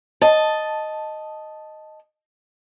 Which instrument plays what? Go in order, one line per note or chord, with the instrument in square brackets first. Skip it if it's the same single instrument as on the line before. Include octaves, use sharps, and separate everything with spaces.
[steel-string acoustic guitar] D#5 A5